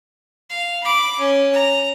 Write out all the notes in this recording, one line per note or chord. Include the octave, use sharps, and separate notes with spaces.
F5
B5 D6
C#4
A#5